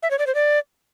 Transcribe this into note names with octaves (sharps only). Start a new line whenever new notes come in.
E5
C#5
D5
C5
D5